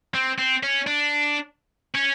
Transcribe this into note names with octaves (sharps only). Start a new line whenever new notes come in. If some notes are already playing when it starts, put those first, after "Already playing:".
C4
C4
C#4
D4
C#4